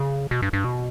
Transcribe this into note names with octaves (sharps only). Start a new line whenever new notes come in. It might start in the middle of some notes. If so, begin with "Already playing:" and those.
Already playing: C#3
B2
G2
G2
B2